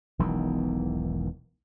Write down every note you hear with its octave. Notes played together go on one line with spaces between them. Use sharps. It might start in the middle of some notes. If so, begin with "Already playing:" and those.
E1 B1 E2 D#3